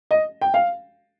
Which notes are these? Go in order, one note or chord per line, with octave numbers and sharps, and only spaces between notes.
D#5
G5
F5